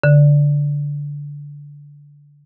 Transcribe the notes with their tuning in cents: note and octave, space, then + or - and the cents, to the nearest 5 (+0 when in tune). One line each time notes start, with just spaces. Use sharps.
D3 -15